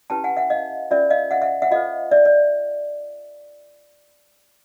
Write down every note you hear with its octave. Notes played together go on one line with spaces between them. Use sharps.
C#4 E4 G4 B4 G5 A5
F#5 G#5
E5 F#5
D#5 F5
C#4 F4 A#4 D5 E5
D#5 F5
E5 F#5
E5 F#5
E5 F#5
F4 A4 C5 D#5 F5
D5 E5
D5